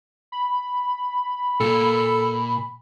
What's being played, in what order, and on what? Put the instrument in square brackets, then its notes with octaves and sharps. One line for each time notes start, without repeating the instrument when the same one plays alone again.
[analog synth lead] B5
[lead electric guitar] A#2 [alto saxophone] A4